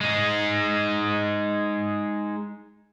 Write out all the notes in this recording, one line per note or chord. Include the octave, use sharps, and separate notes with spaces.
G#3 D#4